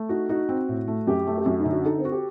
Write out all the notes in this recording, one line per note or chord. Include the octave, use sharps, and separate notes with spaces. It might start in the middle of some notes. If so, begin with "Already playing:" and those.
Already playing: A3
D#4 F#4
D#4 F#4
C4
A2
A3
F#2 G4
A3
G4
F#2 F#4
D#4
D3
F#4
D#4 A4
C4
F#4
G4